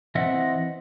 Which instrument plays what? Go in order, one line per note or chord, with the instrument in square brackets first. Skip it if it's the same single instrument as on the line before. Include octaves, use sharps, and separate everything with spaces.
[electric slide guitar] E3 C4 D#5 E5 F#5